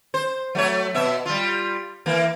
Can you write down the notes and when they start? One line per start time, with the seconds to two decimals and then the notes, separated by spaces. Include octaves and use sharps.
0.14 C5
0.55 F#3 A3 C#5
0.95 B2 E5
1.26 G3 F4
2.06 E3 A#3